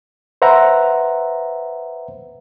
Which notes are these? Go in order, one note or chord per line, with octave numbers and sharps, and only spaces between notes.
B4 C5 E5 F#5 A#5